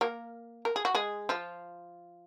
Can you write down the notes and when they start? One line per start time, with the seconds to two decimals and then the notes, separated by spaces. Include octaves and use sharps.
0.01 A#3 A#4
0.65 A#4
0.76 G#4
0.85 F#4
0.95 G#3 G#4
1.29 F3 F4